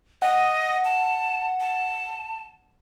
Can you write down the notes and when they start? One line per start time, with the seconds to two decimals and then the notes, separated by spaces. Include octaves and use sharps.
0.22 D#5 F#5
0.85 A5
1.60 A5